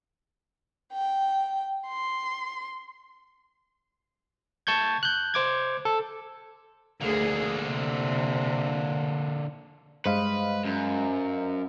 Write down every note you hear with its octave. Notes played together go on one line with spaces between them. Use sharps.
G5
C6
A5 C#6 G6 G#6
F#6 G6
C5 D6 G#6
A4
D2 D3 A#3 G#4
C3
G2 G#3 B4 C5 D#5 F5
F#2